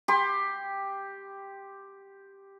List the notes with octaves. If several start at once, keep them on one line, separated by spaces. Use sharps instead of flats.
G4 C6